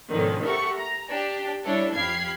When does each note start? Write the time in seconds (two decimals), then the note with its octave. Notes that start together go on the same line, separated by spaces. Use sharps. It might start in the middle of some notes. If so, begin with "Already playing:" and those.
0.10 G#2 B2 D3 D#3 F3 C#4
0.42 G4 A4 A#4 E5 F#5 C#6
0.78 A#5
1.11 D4 G4
1.65 G3 D4 E4 A4 C#5
1.96 F2 G4 F5 B5 G#6 C7